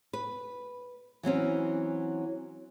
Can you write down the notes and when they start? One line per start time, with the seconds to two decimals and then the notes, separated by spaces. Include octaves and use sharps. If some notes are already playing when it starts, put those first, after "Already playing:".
0.13 B4
1.23 E3 F#3 C4 C#4